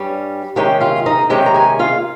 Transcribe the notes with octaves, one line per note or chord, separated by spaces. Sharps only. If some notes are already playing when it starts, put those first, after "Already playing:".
Already playing: G2 G3 C#4
C3 D#3 G#3 C#4 G4 G5
F4 F5
D#4 D#5
C3 D#3 G#3 C#4 G4 G5
A#5
G#4 G#5
F4 F5